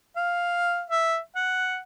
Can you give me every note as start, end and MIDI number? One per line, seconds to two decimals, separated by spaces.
0.17 0.84 77
0.90 1.19 76
1.36 1.79 78